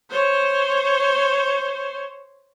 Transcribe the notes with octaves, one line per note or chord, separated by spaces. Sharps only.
C5 C#5